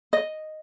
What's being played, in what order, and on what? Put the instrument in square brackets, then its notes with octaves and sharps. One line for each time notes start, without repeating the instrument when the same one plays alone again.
[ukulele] D#5